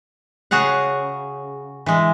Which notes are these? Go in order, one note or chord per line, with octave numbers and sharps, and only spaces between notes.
C#3 F#4 G#4 F5 F#5
E3 G#3